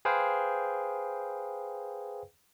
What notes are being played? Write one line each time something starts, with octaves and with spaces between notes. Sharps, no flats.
G#4 B4 C5 F5 G5